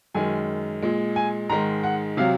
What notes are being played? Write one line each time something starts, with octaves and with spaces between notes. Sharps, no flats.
F#2 D#3 G#3 G#5
A#2 G#3
G#5
G#2 D#3 G#3 A#5
F#5
C3 F#3 F5